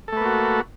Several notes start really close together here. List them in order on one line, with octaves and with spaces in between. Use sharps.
A4 A3 B4 A#3 F#4